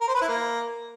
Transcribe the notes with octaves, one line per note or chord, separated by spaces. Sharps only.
A#4
C5
B4
E4
A#3